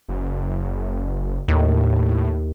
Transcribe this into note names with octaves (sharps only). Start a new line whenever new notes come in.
F#1
D#2 A2